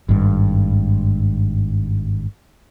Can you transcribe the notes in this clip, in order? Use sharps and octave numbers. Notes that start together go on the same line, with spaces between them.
G#1 G2